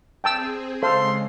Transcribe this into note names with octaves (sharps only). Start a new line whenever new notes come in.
C4 G#4 G5 A5 E6
C#3 G#3 A4 C5 F5 C6